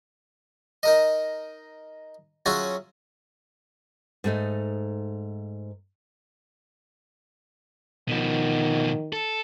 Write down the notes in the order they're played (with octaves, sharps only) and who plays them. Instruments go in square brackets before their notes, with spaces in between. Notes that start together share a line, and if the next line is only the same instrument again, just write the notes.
[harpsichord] D#4 A#4 D#5
F#3 C#4 F4 F#4 G#4 E5
[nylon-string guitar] G#2 A3 D#4
[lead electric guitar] B2 F3 [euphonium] D#3
[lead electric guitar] A4